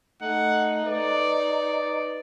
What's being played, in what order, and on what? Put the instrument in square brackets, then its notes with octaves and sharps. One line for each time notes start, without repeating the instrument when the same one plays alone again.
[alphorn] A3 [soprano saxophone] D#4 [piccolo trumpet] F#5
[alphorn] B4 [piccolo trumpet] D5